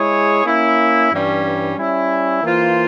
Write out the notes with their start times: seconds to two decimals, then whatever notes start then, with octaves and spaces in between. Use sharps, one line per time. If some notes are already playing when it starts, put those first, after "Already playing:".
Already playing: G#3 E4 G#4 C#5
0.45 A#3 C#4 E4
1.11 G2 E3 G3 C#4
1.77 G3 C#4 E4
2.43 E3 A#3 F4 C5